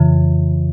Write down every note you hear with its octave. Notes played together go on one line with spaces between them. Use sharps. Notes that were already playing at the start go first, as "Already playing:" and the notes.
Already playing: F2 C#3 E3